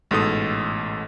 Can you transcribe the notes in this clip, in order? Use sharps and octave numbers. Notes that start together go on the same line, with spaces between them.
A1 G#2 B2 A4 D#6